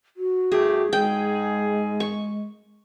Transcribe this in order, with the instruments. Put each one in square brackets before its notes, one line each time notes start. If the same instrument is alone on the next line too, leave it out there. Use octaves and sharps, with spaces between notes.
[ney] F#4
[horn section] G2 A3 G4 [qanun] G#4
[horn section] G#2 G#4 [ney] G#3 [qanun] G5
[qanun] C#6